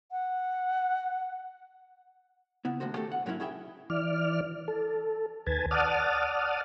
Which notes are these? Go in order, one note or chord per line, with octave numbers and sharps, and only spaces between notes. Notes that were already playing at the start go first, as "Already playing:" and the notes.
F#5
C#3 B3 E4
D#2 A2 D3 F#4 C5
A3 G4 A4
F#5
G#2 F#3 A#3 C#4 D4 E4
C#4 E4 G#4 E5 G5
E3 D5 F6
A4
D#2 B4 G#5 A5
D5 F#5 A5 D#6 F6